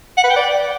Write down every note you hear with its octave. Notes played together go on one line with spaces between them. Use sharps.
F#5
B4
G5
D5